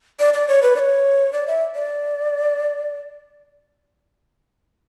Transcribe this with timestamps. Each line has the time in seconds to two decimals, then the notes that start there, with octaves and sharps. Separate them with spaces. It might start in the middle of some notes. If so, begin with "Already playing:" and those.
0.20 D5
0.34 D5
0.48 C#5
0.62 B4
0.76 D5
0.79 C#5
1.33 D5
1.47 E5
1.75 D5